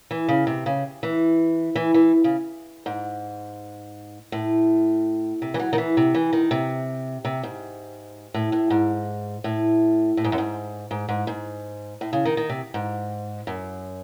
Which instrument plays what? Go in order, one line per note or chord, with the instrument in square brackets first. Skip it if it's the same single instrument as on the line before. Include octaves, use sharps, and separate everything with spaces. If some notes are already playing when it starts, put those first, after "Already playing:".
[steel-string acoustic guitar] E3
C#3
C3
C#3
E3
E3
E3
C#3
G#2
A2
C3
E3
F#3
D#3
E3
C3
E3
D#3
C3
C3
G#2
A2
A2
G#2
A2
A2
G#2
F#2
G#2
G#2
G#2
G#2
A2
C#3
D#3
D#3
C3
G#2
F#2